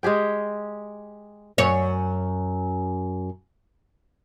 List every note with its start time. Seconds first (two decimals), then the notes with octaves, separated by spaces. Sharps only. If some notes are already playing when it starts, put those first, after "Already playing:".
0.03 G#3 G4 G#4 G5
1.58 F#2 C#5